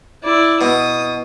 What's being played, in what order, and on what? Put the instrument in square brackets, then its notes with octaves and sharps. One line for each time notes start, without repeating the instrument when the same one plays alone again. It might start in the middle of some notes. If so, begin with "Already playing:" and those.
[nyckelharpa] E4 D5
[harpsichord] B2 [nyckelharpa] D#6